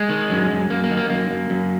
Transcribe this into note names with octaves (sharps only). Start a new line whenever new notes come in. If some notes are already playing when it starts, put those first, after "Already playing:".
Already playing: G#3
D#3
F#2
F#2
F#2 A#3
A#3
D#3
A#3
F#2 A#3
F#2
F#2